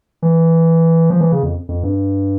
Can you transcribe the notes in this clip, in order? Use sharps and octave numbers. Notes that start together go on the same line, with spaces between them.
E3
F3
E3
C#3
F2
F2
G2